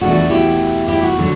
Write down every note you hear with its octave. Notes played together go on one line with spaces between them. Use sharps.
E2 B2 A3 D4 F#4
F#4
E4 G4
E4 G4
F#4
D3 F#3